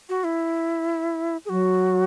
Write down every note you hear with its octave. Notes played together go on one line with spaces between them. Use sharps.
F#4
E4
G#4
F#3 F#4